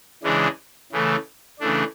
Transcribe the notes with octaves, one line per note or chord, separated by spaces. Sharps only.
C#3 E3 G#3 D4
C#3 E3 A3
C#3 E3 A3 D4